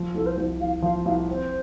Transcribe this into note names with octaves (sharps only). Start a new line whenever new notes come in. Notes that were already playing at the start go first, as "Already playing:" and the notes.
Already playing: F3
C2 A4
C5
C2
C2 F5
F3 F5
C2 F5
C4 C5